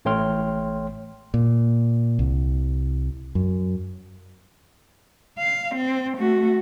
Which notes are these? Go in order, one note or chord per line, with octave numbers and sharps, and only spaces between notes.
A1 A3 C#5 G5 C6 F6
A#2
C2
F#2
F5
C4
A3 F#4